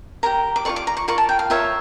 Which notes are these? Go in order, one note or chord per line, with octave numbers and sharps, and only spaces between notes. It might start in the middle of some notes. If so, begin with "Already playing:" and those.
G4 A#4 C#5 A#5
D6
F4 A#4 D5 C#6
D6
A#5
C#6
F4 A#4 D5 C#6
A5
G5
F5
F4 A#4 C#5 E5